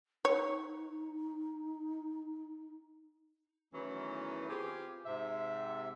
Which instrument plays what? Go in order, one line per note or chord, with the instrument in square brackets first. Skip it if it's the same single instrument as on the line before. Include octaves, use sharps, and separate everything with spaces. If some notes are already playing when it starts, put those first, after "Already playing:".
[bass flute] D#4 [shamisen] C#5
[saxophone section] E2 D#3 E3 F#3 A3 C#4
C4 F4 G4 G#4
G#2 C3 E5